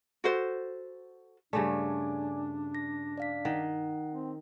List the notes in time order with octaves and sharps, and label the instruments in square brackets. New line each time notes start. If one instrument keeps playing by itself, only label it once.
[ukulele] F#4 A4 C5
[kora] G2 C#3 A3 [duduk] D4 [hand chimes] D5 G#5 D6
[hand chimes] A#6
D5 F5 B6
[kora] D#3 [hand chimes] F#5
[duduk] C4